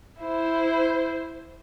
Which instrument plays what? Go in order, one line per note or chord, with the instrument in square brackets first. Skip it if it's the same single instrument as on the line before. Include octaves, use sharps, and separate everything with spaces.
[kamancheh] E4 C5